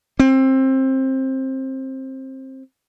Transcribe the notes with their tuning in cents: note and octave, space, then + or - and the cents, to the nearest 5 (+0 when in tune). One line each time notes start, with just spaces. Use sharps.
C4 +20